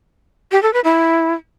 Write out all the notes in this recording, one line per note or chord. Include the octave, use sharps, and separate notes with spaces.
G4
A4
B4
E4